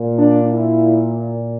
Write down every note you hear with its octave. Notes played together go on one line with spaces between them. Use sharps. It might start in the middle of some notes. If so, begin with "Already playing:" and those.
Already playing: A#2
D4
E4